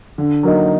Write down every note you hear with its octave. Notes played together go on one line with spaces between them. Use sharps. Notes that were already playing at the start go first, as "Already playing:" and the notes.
D3
F#3 A#3 D#4